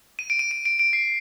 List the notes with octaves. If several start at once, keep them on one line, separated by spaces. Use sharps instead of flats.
D#7
D7
D#7
D#7
D7
D7
C7